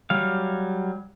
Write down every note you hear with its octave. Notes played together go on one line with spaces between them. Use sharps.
F#3 G3 F5